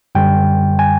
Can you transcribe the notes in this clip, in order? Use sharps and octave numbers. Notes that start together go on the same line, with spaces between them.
F#2 D3 G3 G5
G#5